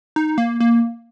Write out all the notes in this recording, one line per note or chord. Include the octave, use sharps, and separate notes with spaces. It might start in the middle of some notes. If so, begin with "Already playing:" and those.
D#4
A#3
A#3